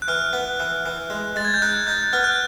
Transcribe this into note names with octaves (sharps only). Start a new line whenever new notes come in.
F#6
E3 F6
B3
E3
E3
G#3
G#3 A6
G#6
G6
D#4 F#6
D#4 G6
B3 F6
F#6